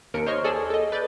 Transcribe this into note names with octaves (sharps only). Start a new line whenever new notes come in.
D#2 A#4 C#7 D7
C5 C#5 D#5 C#6 F6
G#4 A4 D5 G#5 A5
A4 D#5
B4 D5 G6 A6